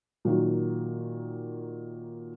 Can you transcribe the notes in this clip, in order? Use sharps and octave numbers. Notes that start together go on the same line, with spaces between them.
A#2 D#3 F#3